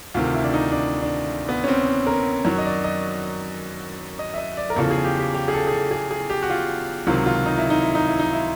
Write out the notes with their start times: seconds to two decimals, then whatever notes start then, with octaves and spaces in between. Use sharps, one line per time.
0.14 D2 C3 D#3 F4
0.34 E4
0.44 D4
0.53 D#4
0.72 D4
1.02 D4
1.49 B3
1.64 C#4
1.68 C4
2.07 A#4
2.45 F#2 D#3 F#3 C#5
2.58 D#5
2.65 D5
2.84 D#5
4.19 D#5
4.34 E5
4.38 D#5
4.57 D5
4.70 A#4
4.76 E2 C#3 F3 A4
4.91 G#4
5.05 G4
5.20 G4
5.34 G4
5.48 G#4
5.54 A4
5.67 G#4
5.72 A4
5.91 G#4
6.11 G#4
6.30 G4
6.43 F#4
6.50 F4
7.07 C#2 C3 D#3 F#3 F4
7.26 F4
7.46 D#4
7.58 E4
7.70 D#4
7.83 E4
7.95 D#4
8.07 E4
8.19 D#4
8.33 E4